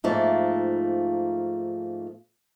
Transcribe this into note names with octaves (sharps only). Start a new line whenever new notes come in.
G#2 F3 A3 A#3